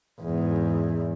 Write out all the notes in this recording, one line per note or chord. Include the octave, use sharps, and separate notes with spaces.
E2 G#2